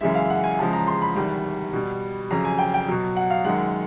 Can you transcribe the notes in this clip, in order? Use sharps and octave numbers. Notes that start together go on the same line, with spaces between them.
F#2 C#3 E3 G#3 E5
F5
F#5
G#5
E2 C#3 F3 G#3 A5
A#5
C6
B5
E2 C3 D#3 G3
B2 G3
F2 C#3 F#3 A#5
G#5
G5
G5
B2 F#3
F#5
F5
F#2 D#3 G#3 F#5